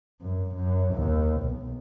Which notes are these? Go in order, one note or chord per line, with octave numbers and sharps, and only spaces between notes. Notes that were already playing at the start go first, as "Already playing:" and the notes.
F#2
F#2
D#2
B1